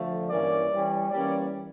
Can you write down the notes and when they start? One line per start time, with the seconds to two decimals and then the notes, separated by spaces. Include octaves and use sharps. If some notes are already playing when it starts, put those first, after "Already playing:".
Already playing: D3 F3 A3
0.30 G2 E3 A#3 C#4 D5
0.70 E3 G3 C#4
1.10 E3 G3 A#3 C#4 D5